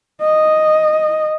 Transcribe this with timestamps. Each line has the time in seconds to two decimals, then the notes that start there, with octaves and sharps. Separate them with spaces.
0.21 D#5